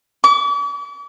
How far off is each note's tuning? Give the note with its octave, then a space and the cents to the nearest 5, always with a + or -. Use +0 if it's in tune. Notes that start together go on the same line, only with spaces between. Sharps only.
D6 -45